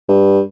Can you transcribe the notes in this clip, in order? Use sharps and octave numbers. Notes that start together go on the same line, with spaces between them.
G2